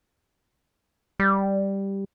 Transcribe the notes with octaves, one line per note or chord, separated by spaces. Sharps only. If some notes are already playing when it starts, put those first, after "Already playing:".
G3